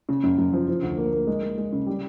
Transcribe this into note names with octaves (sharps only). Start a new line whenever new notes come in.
C#3
F#2
F#2
F3
F3
D2
A#3
A#3
G#3
G#3
G#3
C#3
G3